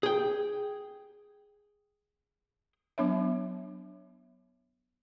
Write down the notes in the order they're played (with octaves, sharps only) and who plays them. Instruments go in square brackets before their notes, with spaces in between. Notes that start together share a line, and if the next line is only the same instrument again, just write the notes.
[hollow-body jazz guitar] G#4 G5
[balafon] F#3 B3 D4 C#5 E5